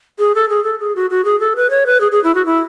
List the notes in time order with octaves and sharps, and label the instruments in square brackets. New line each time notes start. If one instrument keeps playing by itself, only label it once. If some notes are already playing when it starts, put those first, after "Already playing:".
[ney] G#4
A4
G#4
A4
G#4
F#4
F#4
G#4
A4
B4
C#5
B4
G#4
G#4
E4
F#4
E4